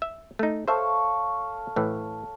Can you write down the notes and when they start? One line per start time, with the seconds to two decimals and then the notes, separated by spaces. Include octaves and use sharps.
0.02 E5
0.39 A3 D#4
0.68 A4 C5 C#5 E5 F5
1.76 A2 E3